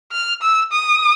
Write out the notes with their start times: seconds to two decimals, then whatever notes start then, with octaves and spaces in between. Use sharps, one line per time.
0.12 F6
0.42 E6
0.73 D#6